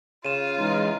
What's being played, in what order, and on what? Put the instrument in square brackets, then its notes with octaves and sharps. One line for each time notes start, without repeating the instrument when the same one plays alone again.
[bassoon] C#3 [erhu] F4 [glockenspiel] D#7 E7
[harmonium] E3 G#3 D#4